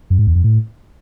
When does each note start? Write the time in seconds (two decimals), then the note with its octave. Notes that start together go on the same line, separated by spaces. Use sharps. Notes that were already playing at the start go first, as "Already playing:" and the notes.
0.10 F#2
0.19 G#2
0.27 E2
0.35 F2
0.44 A2